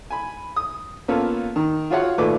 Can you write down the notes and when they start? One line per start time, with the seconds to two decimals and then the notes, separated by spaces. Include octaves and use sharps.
0.10 G#5 B5
0.56 D#6
1.08 A#3 B3 C#4 F4 A4 B4
1.56 D#3
1.90 F4 F#4 G#4 C#5 F5 F#5
2.18 D#2 A#2 A3 B4 D6